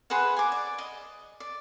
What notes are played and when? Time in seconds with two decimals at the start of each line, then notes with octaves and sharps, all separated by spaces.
0.10 G#4 B4 C5 F#5
0.37 G#5 D6
0.52 D5
0.78 D#5
1.40 D5